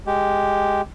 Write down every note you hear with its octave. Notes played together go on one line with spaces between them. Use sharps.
G#3 G4